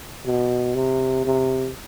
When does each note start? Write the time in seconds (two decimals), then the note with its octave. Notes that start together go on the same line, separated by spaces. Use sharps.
0.26 B2
0.75 C3
1.25 C3